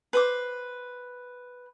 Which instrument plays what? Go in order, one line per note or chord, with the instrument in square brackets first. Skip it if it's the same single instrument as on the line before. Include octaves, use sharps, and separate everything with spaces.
[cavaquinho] B4 C5 D6